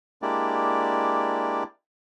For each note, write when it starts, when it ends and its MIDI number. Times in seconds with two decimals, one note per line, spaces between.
0.22 1.64 56
0.22 1.64 58
0.22 1.64 62
0.22 1.64 64
0.22 1.64 67
0.22 1.64 74